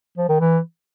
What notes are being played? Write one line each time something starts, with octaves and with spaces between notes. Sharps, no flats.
F3
D#3
E3